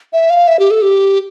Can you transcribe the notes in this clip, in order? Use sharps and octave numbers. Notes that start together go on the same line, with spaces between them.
E5
F5
E5
G4
A4
G4